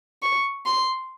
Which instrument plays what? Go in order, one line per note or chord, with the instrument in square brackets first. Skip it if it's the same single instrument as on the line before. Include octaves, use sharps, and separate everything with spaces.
[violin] C#6
C6